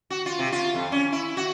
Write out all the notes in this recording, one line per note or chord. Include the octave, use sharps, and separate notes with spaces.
F#4
F4
C3
F4
F2
C#4
E4
F#4